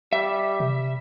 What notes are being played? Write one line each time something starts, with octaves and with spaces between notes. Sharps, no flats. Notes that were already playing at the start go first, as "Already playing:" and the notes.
G3 E5
C3